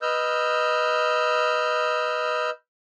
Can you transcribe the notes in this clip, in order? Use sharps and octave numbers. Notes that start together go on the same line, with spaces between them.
B4 D#5 E6 F6 G6